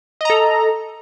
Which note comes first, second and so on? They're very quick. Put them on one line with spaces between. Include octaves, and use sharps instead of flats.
D#5 A#5 A4